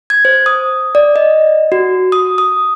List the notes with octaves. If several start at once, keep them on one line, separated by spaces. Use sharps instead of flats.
G#6
C5
D#6
D5
D#5
F#4
D#6
D#6